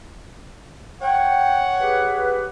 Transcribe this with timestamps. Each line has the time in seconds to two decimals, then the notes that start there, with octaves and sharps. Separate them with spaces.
1.02 C#5 F#5 G5
1.80 G4 G#4 B4